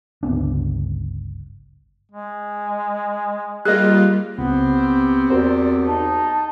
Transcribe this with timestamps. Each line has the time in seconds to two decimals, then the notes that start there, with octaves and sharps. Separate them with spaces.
0.23 G1 C#2 B3 D4
2.12 G#3
3.65 G3 A#3 F4 G#4 A#4 D#5 F#6
4.38 C#2 B3 C4 G4
5.30 E2 F#4 A#4 C5 D5
5.86 D#4 A5